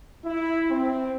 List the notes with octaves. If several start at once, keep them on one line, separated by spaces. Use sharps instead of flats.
E4
C4